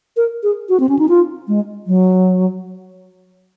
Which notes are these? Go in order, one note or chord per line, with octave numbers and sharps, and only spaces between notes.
A#4
G#4
F#4
C4
C#4
D#4
F4
G#3
F#3